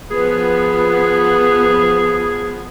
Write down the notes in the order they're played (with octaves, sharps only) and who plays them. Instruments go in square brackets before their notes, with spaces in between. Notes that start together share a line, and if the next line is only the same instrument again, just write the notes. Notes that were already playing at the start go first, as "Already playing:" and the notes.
[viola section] F3 B3 [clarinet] G#4 [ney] B4